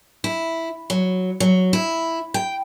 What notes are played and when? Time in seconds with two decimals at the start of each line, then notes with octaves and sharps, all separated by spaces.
0.24 E4
0.90 F#3
1.40 F#3
1.73 E4
2.34 G5